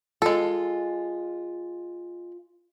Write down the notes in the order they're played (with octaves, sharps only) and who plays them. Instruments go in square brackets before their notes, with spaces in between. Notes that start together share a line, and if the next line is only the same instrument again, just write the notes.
[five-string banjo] G#3 A4 [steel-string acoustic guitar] F4